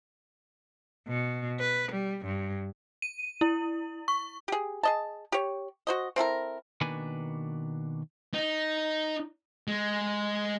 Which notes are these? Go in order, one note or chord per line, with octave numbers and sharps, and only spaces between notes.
B2
B4
G3
G2
D#7
E4
C#6
G4 G#4
G#4 D#5 A5
G4 C#5
F#4 C5 D#5
C4 E4 A4 A#4
B2 D#3 A#3 D4 B4 G#5
D#4
G#3